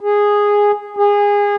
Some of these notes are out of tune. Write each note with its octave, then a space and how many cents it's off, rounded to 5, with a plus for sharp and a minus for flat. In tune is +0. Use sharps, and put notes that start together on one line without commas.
G#4 -10
G#4 -25